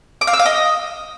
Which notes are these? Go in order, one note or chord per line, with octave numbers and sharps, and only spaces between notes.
D6
F5
E6
F5
D#5